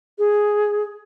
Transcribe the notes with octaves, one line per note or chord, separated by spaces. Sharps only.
G#4